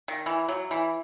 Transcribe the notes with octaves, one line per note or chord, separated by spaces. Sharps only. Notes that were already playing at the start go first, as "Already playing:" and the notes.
D#3
E3
F#3
E3